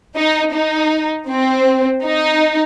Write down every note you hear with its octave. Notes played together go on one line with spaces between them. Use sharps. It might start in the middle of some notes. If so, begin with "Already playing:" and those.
D#4
D#4
C4
D#4